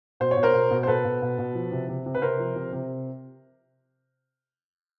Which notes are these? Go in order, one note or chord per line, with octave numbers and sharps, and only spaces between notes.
B2 C5
C#5
B2
A#4 C5
B2
B2
C5
B2 A4 B4
B2
B2
B2
F3
C3
C3
C3
B4
C3 A#4 C5
F3
C3
C3